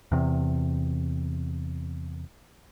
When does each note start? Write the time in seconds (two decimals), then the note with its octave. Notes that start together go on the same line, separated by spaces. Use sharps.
0.12 E2 C3